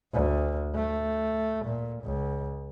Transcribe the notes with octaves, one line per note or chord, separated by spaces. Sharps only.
D2
A3
A#2
C#2